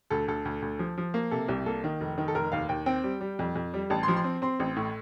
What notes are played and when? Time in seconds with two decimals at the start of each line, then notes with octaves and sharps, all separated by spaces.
0.10 D2 A4
0.28 D2 A4
0.45 D2
0.62 D2
0.79 F3
0.98 F3
1.14 A#3
1.31 C3 A4
1.48 C2 G4
1.66 A#3 A4
1.84 D#3
2.01 F1
2.18 D#3
2.28 A4
2.35 F1 A#4
2.52 D#2 F5
2.69 D#2 G5
2.86 C4 G5
3.04 G3
3.21 G3
3.39 F2
3.56 F2
3.74 G3
3.90 A1 A5
4.03 C6
4.08 F3
4.16 C6
4.24 C4
4.42 C4 C6
4.60 A1
4.76 A2